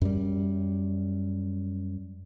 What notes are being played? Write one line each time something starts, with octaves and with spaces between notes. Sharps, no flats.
F#2 G3